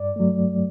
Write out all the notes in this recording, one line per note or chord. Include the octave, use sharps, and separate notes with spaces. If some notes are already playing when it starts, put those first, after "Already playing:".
Already playing: G2 D5
F#3 A3